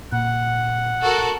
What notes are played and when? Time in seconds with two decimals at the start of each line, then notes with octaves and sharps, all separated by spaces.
0.12 A#2 F#5
1.03 F#4 A4 A#4